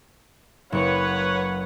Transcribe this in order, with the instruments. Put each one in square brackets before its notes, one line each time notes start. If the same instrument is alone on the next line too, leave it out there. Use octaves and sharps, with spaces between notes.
[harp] F#1 C#7 [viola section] B4 C#5 F#5